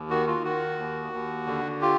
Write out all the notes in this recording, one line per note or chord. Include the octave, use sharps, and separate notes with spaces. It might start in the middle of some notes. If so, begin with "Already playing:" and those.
Already playing: D#2
D#3 F#4
F4
D#3 F#4
D#2
D#2
D3
F4 G4